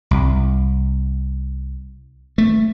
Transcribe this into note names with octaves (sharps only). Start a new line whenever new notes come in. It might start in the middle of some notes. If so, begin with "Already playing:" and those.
C2
A3